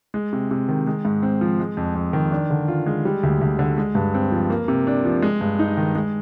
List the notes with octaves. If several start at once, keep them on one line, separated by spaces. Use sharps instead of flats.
G#3
C3
C3
D#3
G#3
G#2
C4
F3
G#3
F2
F2
D#3
D4
D3
F4
G#3
G3
D2
D2
D3
G#3
G2
C4
F3
A#3
C3
D4
F3
G#3
G2
D#4
D#3
G#3